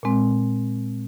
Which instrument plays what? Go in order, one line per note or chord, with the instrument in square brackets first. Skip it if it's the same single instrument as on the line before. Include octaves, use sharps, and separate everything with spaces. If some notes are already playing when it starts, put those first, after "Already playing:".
[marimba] A#2 G#3 C4